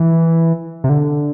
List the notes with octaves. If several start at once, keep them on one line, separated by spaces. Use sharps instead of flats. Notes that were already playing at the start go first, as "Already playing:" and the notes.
Already playing: E3
C3
D3